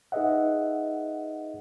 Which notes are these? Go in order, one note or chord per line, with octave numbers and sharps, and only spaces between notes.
D#4 G#4 B4 D#5 E5 F#5